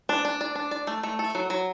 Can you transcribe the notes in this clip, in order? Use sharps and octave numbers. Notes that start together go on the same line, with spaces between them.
D4
D4
D5
D4
D5
A3
A3
A4
F#3
F#3